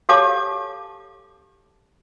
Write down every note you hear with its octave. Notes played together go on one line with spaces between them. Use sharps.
G4 A4 C#5 F5 A5 D6